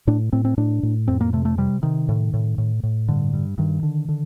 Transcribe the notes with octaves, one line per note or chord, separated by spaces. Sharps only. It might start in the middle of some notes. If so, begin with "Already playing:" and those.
A2 D4
A2 C4
C4
A2 D4
A2
F2 C4
A#3
C3 A3
A3
C3 G3
C3 D#3
A2
A2
A2
A2
G2 D3
G2
G2 D#3
D3
D3